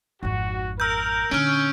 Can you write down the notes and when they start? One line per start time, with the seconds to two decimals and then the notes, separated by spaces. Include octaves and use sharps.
0.23 G#1 F2 F#4
0.80 A#4 E6 G6
1.31 A#2 D3 C#4 F6 D7